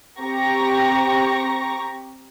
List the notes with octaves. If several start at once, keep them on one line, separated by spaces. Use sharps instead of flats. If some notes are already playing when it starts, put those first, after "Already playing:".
C4 G4 A#5 C#6 A#6